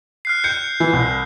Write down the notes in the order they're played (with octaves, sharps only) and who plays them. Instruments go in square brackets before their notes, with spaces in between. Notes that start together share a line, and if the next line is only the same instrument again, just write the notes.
[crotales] F6 F#6 C7
[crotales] G6 [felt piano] C#7
[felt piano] E3
C2